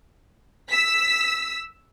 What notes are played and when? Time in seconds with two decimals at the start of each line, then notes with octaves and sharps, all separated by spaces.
0.69 E6 B6